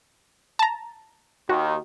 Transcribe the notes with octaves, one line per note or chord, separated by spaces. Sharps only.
A5 A#5
D#2 D#3 F#4